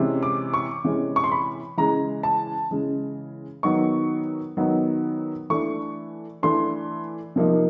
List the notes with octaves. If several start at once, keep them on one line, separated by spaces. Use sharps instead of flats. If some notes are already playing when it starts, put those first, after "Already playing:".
Already playing: C3 E3 G#3 C#4
D6
C#6
C3 E3 G#3 C#4
C#6
C6
B5
C#3 E3 G#3 A#5
A5
C#3 E3 G#3
D#3 F#3 B3 D#4 C#6
D#3 F#3 B3 D#4
E3 A3 D4 C#6
E3 A3 D4 C6
C3 F3 A#3 D#4